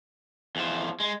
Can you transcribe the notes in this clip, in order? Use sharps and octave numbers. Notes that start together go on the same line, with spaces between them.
E2 F3
G#3